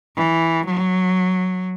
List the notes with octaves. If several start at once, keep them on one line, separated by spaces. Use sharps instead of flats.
E3
F#3